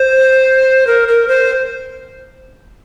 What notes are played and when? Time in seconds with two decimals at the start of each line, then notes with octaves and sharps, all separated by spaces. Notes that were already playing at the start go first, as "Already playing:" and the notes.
Already playing: C5
0.87 A#4
1.08 A#4
1.28 C5